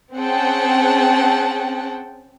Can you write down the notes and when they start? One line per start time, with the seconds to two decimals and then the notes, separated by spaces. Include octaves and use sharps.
0.15 C4 C#4 G#4 F#5 G5 A5